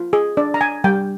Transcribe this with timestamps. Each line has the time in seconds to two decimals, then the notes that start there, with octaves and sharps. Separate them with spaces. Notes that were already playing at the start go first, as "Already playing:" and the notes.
Already playing: F4
0.13 G#4
0.37 D4 D5
0.54 A#5
0.61 G#5
0.84 G3 G5